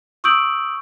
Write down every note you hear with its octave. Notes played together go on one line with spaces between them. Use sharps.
C#6 D#6 E6 G6 D7 F#7